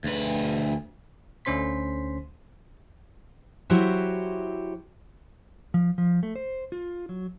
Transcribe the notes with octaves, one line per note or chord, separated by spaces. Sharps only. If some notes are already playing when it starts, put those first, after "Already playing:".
D2 B4
D2 D3 C#4 C5 C6 B6
F#3 E4 F#4 G4 C5 E5
F3
F3
A3
C5
F4
F#3